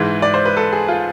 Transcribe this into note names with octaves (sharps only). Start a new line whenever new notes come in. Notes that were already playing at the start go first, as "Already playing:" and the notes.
Already playing: G#2 E3 G#3
D5
C5
B4
A4
G#4
F4